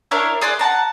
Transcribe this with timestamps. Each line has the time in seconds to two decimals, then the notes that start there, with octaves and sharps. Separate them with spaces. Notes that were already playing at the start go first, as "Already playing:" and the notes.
0.11 D4 E4 A#4 C#5
0.41 G#4 D5 C6 F#6
0.59 F#5 G5 A5 A#5